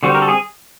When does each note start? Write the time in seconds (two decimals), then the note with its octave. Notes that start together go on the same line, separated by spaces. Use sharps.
0.03 D3 G3 C4 F#4
0.15 A#4
0.22 A4
0.28 G#4